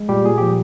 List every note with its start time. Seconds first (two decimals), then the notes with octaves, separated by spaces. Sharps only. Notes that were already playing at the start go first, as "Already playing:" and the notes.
Already playing: G#3
0.09 A#2 G3 G4
0.25 A#2 G#4
0.38 F3 G4